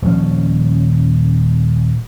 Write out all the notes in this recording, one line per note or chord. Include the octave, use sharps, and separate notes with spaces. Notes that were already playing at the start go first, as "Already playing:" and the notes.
D#1 F3 C#4